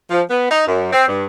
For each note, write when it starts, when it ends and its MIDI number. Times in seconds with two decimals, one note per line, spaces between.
0.10 0.22 53
0.30 0.47 59
0.50 0.64 63
0.67 0.90 42
0.93 1.08 60
1.08 1.25 43